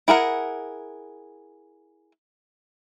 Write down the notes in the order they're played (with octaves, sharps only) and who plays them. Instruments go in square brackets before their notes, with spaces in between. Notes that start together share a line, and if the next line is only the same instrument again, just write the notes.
[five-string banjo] E4 G#4 A#4 F#5